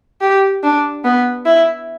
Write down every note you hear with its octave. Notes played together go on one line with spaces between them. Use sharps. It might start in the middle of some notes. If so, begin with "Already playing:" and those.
G4
D4
B3
E4